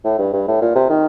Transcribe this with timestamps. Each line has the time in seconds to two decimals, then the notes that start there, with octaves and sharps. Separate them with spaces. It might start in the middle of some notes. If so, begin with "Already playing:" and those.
0.04 A2
0.19 G2
0.33 G2
0.48 A2
0.61 A#2
0.75 C3
0.89 D#3